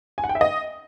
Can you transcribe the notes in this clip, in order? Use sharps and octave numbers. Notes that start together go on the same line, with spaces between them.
G#5
F#5
G5
E5
D#5